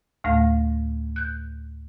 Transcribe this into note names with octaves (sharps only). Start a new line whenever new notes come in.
D2 A2 A3 F5 F6 A#6
F#6 G6